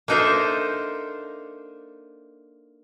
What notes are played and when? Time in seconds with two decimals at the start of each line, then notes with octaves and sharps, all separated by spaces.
0.08 A#3 D4 D#4 A4 C5 E5